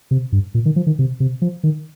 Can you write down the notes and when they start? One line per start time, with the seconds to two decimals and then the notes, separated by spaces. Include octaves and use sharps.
0.11 C3
0.32 G2
0.54 A#2
0.65 D#3
0.76 F3
0.87 D#3
0.99 C3
1.20 C3
1.42 F3
1.63 D#3